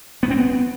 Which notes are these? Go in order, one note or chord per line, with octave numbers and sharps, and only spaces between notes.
B3
C4
B3